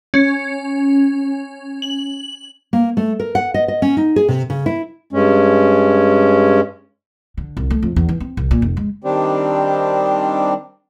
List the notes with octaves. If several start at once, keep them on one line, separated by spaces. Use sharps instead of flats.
C#4
F#7
A#3
A3
A#4
F#5
D#5
D#5
C#4
D#4
G#4
C3
C#3
E4
G2 G#3 C#4
D3
C2
A3
F2
E2
E3
C4
C2
A#2
F1
G#3
D#3 G3 C4 D4 G4